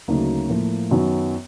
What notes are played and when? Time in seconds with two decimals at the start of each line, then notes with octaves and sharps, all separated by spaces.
0.08 D2 C#3 F#3 A#3 D#4
0.49 A2 F3 A#3
0.91 F#2 D#3 F#3 B3